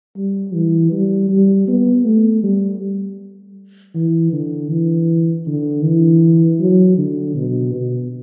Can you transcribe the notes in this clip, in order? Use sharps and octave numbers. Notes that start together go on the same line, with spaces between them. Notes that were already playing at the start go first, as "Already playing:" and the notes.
G3
E3
G3
G3
B3
A3
G3
E3
D3
E3
D3
E3
F#3
D3
B2
B2